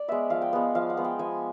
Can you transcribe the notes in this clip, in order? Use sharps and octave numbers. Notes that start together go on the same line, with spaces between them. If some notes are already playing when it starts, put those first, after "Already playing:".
Already playing: D5
G#3 B3 E5
F3 F5
G5
G#3 B3
F3 F5
F#5
G#3 B3
G5
F3 G#5